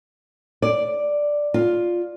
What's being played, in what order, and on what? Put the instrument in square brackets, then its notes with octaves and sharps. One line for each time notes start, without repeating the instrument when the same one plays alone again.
[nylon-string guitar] D5
F4